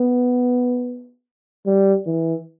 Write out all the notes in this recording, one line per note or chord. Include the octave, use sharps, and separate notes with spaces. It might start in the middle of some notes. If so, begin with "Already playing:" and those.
Already playing: B3
G3
E3